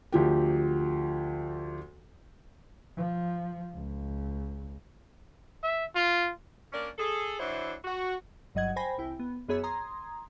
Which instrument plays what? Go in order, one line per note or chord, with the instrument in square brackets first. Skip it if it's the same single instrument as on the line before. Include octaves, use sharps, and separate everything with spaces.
[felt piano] D2 F3 G4
[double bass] F3
C#2
[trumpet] E5
F4
[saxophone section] A#3 C#4 D4 A#4 D5
G#4 A4
E3 D4 E4 F#4 C5 C#5
F#4
[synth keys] G1 G2 F#3 D#5 F#5 G#6
C5 G5 G#5 B5 A#6
C2 E4 G5
B3
F#2 B3 G#4 C#5 B5 E6
A#5 C6 D#6 G#6